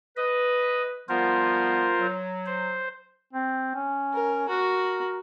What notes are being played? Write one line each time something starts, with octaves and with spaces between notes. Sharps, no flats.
B4 D#5
F3 G3 B3 F4 A#4 C5
F#3
C5
C4
C#4
A#4
F#4 A#4